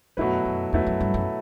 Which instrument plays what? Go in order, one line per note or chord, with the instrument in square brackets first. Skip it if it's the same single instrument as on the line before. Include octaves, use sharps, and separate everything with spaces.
[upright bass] F#2 [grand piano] B2 F#3 A3 E4 B4
[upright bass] F#2
[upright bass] E2 [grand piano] B2 F#3 A3 E4 B4
[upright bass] F#2
G2
F#2